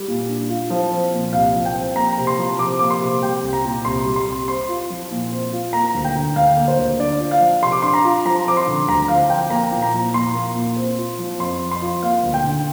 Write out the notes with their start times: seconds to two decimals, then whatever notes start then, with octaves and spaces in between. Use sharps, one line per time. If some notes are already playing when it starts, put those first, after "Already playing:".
Already playing: G3
0.08 A#2
0.28 D4
0.49 F4
0.70 F3
0.91 C4
1.13 A#2
1.33 C2 F5
1.55 F3
1.65 G5
1.75 C4
1.96 A#3 A#5
2.18 C3
2.27 C6
2.38 F3
2.59 C3 D6
2.79 A#3 D6
2.90 C6
3.01 C3
3.21 G3 G5
3.43 C2
3.53 A#5
3.64 A#2
3.85 C2 C6
4.06 G3
4.16 C6
4.27 C2
4.48 C4 C6
4.69 F4
4.90 F3
5.11 A#2
5.32 C4
5.52 F4
5.73 A#3 A#5
5.95 D2
6.04 G5
6.15 D3
6.36 D2 F5
6.57 A#3
6.68 C5
6.78 D2
6.99 D4 D5
7.20 F4
7.31 F5
7.41 F3
7.62 C3 C6
7.72 D6
7.82 D4 C6
7.94 A#5
8.05 F4
8.25 F3 A#5
8.46 C4 D6
8.57 C6
8.67 D3
8.88 D2 A#5
9.08 F3 F5
9.30 C4 G5
9.50 A#3 A#5
9.72 A#2
9.82 A#5
9.93 F3
10.14 A#2 C6
10.34 A#3
10.55 A#2
10.76 C4
10.98 F4
11.18 F3
11.39 F2 C6
11.60 C4
11.71 C6
11.82 F4
12.03 A#3 F5
12.23 D2
12.34 G5
12.44 D3